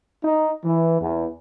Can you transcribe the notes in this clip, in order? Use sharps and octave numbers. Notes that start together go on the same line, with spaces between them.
D#4
E3
E2